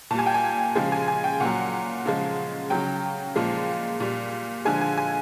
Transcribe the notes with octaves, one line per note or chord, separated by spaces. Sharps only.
A#2 G3 G#5 A5
G5
G#5
C#3 F3 G#3
G#5
G#5
G5
A#2 F#3 F#5
C#3 F3 G#3
C#3 F#3 G5
A#2 F3 G#3
A#2 G3
D3 F3 G#3 G#5
G#5
G#5